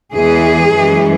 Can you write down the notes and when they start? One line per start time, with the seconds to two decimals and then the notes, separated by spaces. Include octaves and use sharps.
0.13 E2 E3 G#3 G#4
0.74 F#2 E3 G#3